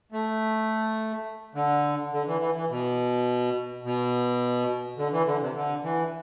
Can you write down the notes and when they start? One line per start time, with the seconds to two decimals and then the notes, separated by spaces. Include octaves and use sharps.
0.12 A3
1.55 D3
2.13 D3
2.27 E3
2.40 E3
2.55 E3
2.70 B2
3.84 B2
4.98 D3
5.12 E3
5.26 D3
5.41 C3
5.55 D3
5.83 E3